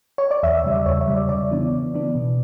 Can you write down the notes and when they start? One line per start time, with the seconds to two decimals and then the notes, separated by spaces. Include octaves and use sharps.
0.18 C#5
0.31 D5
0.43 E2 E5
0.57 E5
0.64 C#3 G3
0.72 D5
0.86 E2 C#5
1.01 E5
1.08 C#3 G3
1.15 D5
1.29 C#3 D5
1.51 E3 B3 D4
1.73 C#3
1.94 E3 B3 D4
2.15 B2